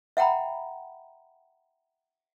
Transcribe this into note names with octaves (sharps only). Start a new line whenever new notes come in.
E5 F#5 G5 A#5 B5